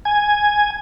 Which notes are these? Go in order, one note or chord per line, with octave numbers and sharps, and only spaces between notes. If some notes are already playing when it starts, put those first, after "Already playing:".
G#5